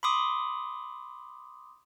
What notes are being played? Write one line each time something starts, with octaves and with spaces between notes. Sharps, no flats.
B5 C6 D6 D#6